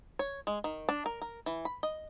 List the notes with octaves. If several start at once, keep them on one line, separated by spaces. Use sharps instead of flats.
C#5
G#3
D#3
D4
A#4
A#4
E3
B5
D#5